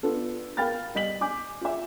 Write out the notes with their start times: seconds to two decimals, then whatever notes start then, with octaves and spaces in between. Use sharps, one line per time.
0.03 B3 D4 F4 A4
0.57 A#4 F5 G5 B5 F6 A6
0.95 G3 D#5 B6 F#7
1.21 G#5 D6 G6
1.61 F4 E5